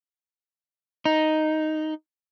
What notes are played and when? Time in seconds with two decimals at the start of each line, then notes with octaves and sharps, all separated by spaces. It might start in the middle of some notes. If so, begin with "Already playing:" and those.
1.05 D#4